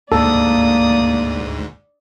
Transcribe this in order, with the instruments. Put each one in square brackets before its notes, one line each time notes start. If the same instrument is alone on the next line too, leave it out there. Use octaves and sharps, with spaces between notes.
[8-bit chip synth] D2 G#2 [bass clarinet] A#3 [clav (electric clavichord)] A4 [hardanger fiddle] D5 D#6